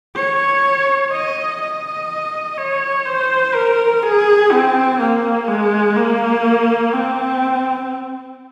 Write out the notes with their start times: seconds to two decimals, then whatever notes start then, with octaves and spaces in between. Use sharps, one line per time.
0.16 C#5
1.12 D#5
1.61 D#5
2.58 C#5
3.06 C5
3.55 A#4
4.03 G#4
4.52 C4
5.00 A#3
5.49 G#3
5.97 A#3
6.94 C4